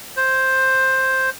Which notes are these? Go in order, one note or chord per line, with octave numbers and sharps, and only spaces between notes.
C5